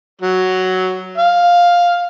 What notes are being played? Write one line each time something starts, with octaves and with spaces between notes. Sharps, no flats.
F#3
F5